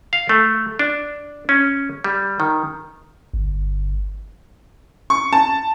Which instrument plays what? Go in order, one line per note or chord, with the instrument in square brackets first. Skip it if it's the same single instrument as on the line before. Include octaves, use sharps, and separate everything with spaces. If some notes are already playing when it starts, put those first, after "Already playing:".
[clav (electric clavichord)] F5
A3
D4
C#4
G3
D#3
[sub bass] G1
[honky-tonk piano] C#6
A5